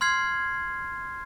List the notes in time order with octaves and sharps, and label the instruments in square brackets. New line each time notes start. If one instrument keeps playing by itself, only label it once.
[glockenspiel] C6 F6 G#6 C7